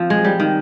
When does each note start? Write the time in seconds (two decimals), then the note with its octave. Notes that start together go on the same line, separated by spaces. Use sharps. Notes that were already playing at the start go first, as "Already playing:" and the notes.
Already playing: F3 C4
0.10 G#3
0.25 G3
0.40 D#3